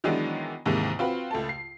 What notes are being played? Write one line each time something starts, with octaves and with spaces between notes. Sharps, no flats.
D#3 E3 F#3 G#3 B3 D4
D#2 G#2 C3 D#3 E3 G#3
C4 F4 F#4 B4
C#2 A3 A5
C7